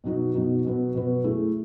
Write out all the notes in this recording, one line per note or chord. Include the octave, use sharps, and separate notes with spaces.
B2 F#3 B3 D#4 F#4
B2 F#3 B3 D#4 F#4
B2 F#3 B3 F#4 B4
B2 F#3 B3 F#4 B4
A3 E4 G#4